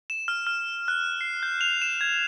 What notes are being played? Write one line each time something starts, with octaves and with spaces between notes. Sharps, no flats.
E7
F6
F6
F#6
C7
G6
F7
E7
G#6